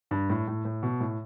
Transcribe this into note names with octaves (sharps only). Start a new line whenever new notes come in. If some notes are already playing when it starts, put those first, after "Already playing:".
G2
A2
A2
A2
B2
A2